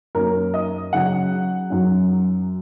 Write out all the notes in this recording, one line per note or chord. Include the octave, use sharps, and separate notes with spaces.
F#2 F#3 A#3 C#4 A#4
D#5
C#3 F#3 C#4 F#5
F#2 F#3 C#4